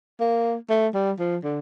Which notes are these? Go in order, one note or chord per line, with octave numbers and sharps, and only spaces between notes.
A#3
A3
G3
F3
D3